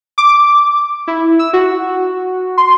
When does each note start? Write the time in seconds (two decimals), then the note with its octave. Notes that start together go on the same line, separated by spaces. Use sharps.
0.18 D6
1.08 E4
1.39 E6
1.53 F#4
2.58 C6